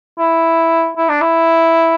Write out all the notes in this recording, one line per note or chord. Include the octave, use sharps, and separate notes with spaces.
E4
E4
D4
E4